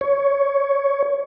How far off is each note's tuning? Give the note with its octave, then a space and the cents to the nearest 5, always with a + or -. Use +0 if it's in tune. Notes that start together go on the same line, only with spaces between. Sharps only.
C#5 +10